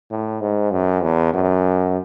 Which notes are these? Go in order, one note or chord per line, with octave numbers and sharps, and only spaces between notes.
A2
G#2
F#2
E2
F#2